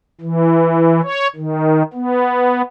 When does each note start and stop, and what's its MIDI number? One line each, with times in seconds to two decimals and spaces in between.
0.21 1.01 52
1.03 1.27 73
1.36 1.82 51
1.93 2.62 59